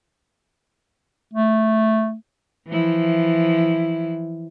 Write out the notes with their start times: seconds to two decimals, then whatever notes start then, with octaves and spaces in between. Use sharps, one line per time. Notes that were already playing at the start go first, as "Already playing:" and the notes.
1.33 A3
2.67 E3 F3 E4